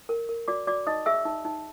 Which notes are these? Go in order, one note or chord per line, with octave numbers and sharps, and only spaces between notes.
A#4
A#4
F#4 D5 D6
F#4 D5 D6
D#4 D#5 D#6
G#4 E5 E6
D#4
D#4